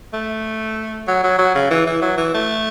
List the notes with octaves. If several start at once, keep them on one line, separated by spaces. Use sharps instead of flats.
A3
F#3
F#3
F#3
C#3
E3
E3
F#3
E3
A3